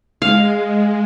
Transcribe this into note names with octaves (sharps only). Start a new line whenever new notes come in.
G#3 F5